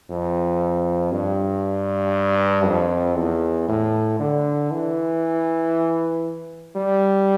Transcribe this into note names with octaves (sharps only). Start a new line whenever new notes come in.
F2
G2
F2
E2
A2
D3
E3
G3